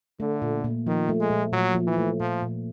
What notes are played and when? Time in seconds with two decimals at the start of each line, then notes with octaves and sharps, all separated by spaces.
0.20 D3 A3
0.42 A#2
0.64 A#2
0.87 D#3 F3
1.09 A3
1.20 G#3
1.30 A#2
1.53 A#2 F#3
1.75 F3
1.87 E3
1.98 A3
2.20 A#2 F3
2.42 A#2